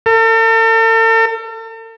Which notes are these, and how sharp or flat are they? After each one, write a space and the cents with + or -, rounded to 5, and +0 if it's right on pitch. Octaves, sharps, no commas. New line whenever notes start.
A4 +45